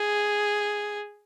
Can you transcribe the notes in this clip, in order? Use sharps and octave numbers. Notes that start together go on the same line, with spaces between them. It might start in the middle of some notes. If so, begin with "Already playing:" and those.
Already playing: G#4